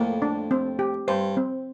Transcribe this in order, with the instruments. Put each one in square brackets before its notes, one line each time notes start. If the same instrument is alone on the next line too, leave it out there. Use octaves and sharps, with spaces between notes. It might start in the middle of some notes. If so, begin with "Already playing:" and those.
Already playing: [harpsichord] F2 A2 [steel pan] A#3
[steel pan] D4
C4
G4
[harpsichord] G2 [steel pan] C5
[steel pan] C4